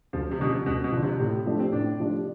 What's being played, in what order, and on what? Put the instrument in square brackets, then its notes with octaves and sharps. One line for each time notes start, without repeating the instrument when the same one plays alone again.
[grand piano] D2 [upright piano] F3
[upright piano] C3
[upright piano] B2 [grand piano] D3
[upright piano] C3 [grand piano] F3
[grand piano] D2 [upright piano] B2
[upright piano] B2
[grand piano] D3 F3
[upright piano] C3
[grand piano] A2 [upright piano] C3
[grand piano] F3 A3 D4 G4
[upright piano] C4
[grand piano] A2 [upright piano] D4
[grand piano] F3 A3 D4 G4